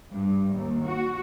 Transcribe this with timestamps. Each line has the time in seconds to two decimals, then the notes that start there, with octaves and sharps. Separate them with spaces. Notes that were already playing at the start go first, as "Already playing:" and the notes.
0.11 G2
0.55 D#2
0.85 F#4